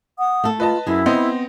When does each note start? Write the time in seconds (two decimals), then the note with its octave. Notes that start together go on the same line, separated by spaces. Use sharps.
0.18 F#5 D#6
0.44 A3 A4
0.60 F4 B4 D#5 A5
0.86 F#2 E4 G#4
1.06 B3 C4 C5 D#5